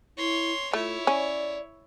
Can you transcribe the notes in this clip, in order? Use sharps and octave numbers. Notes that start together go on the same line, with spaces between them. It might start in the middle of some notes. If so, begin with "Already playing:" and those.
E4 C#5 C6
A3 E4 F4 C#5
C#4 D5